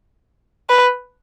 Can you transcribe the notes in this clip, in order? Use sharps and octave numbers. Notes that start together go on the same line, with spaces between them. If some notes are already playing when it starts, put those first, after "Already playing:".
B4